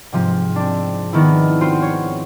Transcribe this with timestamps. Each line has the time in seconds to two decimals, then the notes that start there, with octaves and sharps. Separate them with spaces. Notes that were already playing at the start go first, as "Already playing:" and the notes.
0.12 G#2 C3 F3
0.56 C4 D4
1.13 D#3 B3 D4 E4
1.61 C4 F4 F#4 C5
1.82 C#5